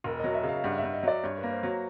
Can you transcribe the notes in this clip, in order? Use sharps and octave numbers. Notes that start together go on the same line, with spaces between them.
E1 A#4
F#3 D#5
E5
C#3
F5
G2 F#5
E5
G2
D#5
F#3 D5
G2 C#5
B4
A#3
C5
F#3 C#5